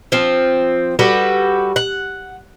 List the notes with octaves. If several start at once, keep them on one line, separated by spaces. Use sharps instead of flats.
F3 C4
G3 F#4 A4 B4
F#5